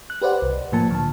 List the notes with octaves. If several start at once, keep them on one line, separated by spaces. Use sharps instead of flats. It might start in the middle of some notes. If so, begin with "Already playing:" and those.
F#6
G4 B4 C5 D5 F#5
C2
A2 F3 A#3 A5
D3 A5